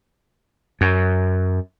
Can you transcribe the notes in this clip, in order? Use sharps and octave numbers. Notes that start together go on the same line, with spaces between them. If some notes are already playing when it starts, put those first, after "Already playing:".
F#2